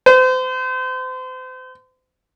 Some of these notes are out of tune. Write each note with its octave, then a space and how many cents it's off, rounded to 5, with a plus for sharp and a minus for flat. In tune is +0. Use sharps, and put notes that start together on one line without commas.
C5 -35